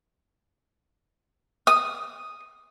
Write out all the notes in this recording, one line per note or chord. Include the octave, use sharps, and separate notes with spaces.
D#6